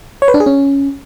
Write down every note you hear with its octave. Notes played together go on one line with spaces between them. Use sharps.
C#5
B4
D4
G#4
C#4